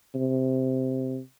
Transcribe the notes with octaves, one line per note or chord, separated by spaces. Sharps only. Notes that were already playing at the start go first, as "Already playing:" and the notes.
C3